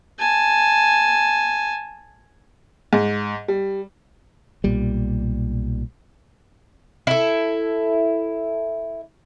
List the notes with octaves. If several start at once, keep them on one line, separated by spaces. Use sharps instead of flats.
G#5 A5
G#2
G3
B1 A#2 G3
E4 A4